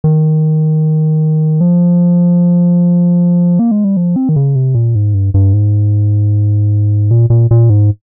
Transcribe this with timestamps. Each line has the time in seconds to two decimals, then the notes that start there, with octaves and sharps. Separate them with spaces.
0.04 D#3
1.61 F3
3.59 A#3
3.71 G#3
3.84 G3
3.97 F3
4.16 C4
4.29 D#3
4.36 C#3
4.55 C3
4.75 A#2
4.95 G#2
5.14 G2
5.34 G2
5.53 G#2
7.11 A#2
7.30 A#2
7.51 A#2
7.70 G#2